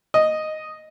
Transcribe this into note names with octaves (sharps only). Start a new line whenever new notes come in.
D#5